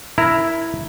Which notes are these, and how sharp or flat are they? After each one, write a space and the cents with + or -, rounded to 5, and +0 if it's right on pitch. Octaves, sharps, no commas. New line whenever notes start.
E4 +0 A#4 +15 A#5 -5